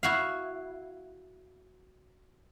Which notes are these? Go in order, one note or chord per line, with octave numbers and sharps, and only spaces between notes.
E4 F#4 F5